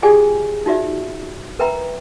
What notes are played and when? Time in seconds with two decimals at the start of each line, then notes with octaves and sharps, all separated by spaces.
0.02 F4 G4 G#4 D5 G5 G#5
0.66 D#4 F4 F#4 D5 E5
1.59 A#4 B4 E5 G5 A#5 B5